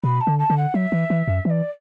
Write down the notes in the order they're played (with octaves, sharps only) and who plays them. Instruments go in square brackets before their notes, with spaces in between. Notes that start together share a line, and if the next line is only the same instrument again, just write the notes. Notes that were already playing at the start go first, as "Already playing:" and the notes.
[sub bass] B2 [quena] B5
[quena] A5
[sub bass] D3
[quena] A5
[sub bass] D3
[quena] F#5
[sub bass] F#3 [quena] E5
[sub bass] E3
E3
F#2
[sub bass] E3 [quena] D5 E5